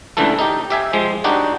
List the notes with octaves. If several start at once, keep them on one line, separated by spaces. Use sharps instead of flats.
C#2 D3 E3 A3 A4
D#4 G4
G4 E5 G#5
F3 G#3
D4 D#4 F#4 G4